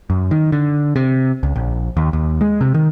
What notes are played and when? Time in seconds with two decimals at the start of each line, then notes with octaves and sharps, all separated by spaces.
0.10 F#2
0.31 D#3
0.52 D3
0.96 C3
1.43 C#2
1.56 A#1
1.97 D#2
2.13 D#2
2.41 G#3
2.61 C3
2.75 D#3